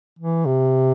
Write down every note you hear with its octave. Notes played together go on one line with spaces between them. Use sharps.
E3
C3